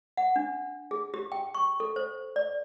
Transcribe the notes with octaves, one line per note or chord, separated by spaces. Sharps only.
F#5
D4
G#4
G4
G5
C#6
A4
C5
D5